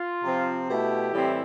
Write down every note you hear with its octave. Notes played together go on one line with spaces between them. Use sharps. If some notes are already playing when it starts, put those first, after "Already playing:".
Already playing: F4
C3 F3 C4
B2 A3 E4 G4
A2 E3 G3 C4 E4